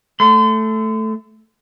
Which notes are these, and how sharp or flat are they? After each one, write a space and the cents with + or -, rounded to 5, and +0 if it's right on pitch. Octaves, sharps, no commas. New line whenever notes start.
A3 +0 C6 -35